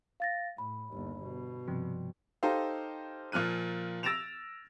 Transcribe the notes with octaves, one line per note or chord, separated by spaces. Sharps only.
F5 A6 A#6
A2 B5
G1 D#2
B2
G2 C3 F3
D#4 G4 A4 C5 F5
A#2 F3 F6 F#6 D#7
E6 A6 A#6 D7 E7 F7